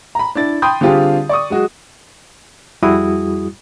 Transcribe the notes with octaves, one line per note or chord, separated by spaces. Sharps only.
A#5 B5
D4 E4 A6
G5 B5 C6 D#6 G6
D3 G3 C4 F4 G4 G#4
D5 C#6 D#6
F#3 G#3 F#4
F2 G3 E4 F#4 G#4 D#6